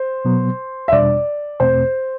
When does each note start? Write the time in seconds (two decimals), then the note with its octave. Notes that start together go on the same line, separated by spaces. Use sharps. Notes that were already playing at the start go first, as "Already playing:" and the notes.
Already playing: C5
0.25 B2 F#3 B3
0.88 E5
0.92 E2 B2 G3 D4 D5
1.60 E2 B2 A3 C4 C5